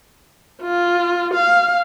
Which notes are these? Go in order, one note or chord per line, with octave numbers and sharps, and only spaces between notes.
F4
F5